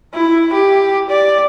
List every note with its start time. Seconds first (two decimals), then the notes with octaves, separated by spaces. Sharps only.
0.14 E4
0.53 G4
1.10 D5